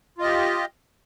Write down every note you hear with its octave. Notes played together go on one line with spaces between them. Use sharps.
F4 G4 D#5